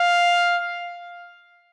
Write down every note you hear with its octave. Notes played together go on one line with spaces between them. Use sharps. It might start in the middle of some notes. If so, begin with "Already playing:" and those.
Already playing: F5